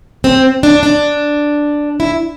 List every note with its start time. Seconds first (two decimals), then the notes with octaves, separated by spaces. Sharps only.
0.24 C4
0.63 D4
0.83 D4
2.00 E4